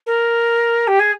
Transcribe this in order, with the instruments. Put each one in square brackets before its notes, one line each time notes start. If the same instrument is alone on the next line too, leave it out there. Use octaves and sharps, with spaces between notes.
[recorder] A#4
G4
G#4